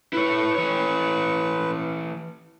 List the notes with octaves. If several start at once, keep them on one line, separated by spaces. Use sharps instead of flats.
E4 B4 C#5
E3 C#5